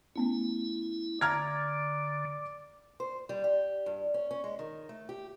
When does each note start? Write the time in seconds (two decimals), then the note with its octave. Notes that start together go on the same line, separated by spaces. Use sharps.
0.16 A3 B3 C#4 E4
1.21 D3 D5 A#5 F6 G#6
3.00 C5
3.29 G3
3.44 G4
3.86 G2
4.14 C#4
4.31 C#4
4.44 G#3
4.59 D#3
4.89 A3
5.09 G4